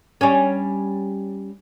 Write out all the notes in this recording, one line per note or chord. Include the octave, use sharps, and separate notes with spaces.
G3 C#4